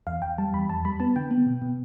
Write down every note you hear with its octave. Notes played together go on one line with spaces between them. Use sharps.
E2 F5
E2 G5
G3 A5
E2 B5
F2 A5
G3 B5
B3 A5
D3 G5
B3
B2
B2